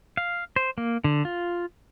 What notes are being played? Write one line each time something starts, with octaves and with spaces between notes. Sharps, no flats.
F5
C5
A#3
D3
F4